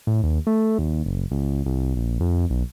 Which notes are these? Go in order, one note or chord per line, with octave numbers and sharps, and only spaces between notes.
A2
D#2
A3
D#2
F#1
C#2
C2
A#1
F2
B1